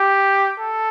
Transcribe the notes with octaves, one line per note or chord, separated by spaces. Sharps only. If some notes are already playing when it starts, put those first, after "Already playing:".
Already playing: G4
A4